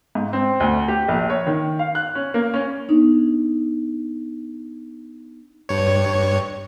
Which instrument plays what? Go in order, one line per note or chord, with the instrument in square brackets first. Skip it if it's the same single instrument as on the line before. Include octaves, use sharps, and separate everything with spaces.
[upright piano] G#2
C4
D2
G4
A#1
C#5
D#3
F5
F#6
C#4
A#3
C#4
[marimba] B3 D4 D#4
[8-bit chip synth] G2 C#5